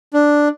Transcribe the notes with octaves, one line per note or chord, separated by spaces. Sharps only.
D4